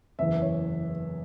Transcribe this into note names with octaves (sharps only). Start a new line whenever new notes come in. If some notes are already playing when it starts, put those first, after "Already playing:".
F#1 E2 E3 E5
C#5